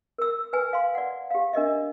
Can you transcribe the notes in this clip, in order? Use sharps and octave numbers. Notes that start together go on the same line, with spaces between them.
A#4 E6
B4 G#5
F5 C6
D5 F#5
G4 F5
D4 A#4 D#5 E5